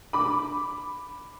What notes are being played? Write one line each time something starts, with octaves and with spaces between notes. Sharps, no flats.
B5 D6